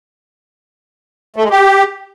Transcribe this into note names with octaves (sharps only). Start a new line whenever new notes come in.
A3
G#3
G4